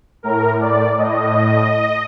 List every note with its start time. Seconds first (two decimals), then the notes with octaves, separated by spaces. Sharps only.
0.23 A2 A#4
0.61 D5
0.98 A2 D#5